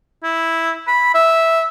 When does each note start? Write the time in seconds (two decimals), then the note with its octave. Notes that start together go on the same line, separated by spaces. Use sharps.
0.23 E4
0.87 B5
1.15 E5